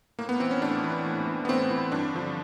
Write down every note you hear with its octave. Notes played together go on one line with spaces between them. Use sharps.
A2 A#3
B3
E3 C4
C#4
A2 D4
E3
A2
E3
B3
A2 C4
E3
G2 D4
D3 F3